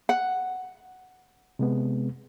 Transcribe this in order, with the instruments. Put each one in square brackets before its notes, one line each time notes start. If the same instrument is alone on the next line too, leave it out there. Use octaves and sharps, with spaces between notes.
[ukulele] F#5
[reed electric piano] C3 G#3 B3